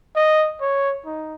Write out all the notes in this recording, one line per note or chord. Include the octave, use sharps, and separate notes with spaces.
D#5
C#5
D#4